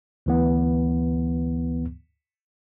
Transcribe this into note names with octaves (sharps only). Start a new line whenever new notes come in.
D2 E3 B3